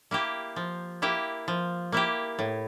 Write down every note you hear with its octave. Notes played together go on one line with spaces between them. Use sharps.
A#3 E4 G4
F3
A#3 E4 G4
F3
A#3 E4 G4
A2